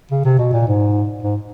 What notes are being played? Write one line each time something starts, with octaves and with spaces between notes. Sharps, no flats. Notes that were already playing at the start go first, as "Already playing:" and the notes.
C#3
C3
B2
A#2
G#2
G#2